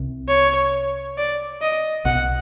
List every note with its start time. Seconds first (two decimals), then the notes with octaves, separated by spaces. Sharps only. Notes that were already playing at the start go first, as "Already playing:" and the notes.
Already playing: C2 C3
0.28 C#5
1.17 D5
1.61 D#5
2.05 B1 B2 F#5